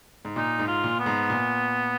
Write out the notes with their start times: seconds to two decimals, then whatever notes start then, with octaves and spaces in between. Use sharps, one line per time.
0.25 G#2
0.36 A#2 D#4
0.59 G#2
0.67 F4
0.84 A#2
0.99 B3
1.06 G#2
1.30 A#2